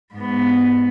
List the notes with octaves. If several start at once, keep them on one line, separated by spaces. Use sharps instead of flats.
G#2 B3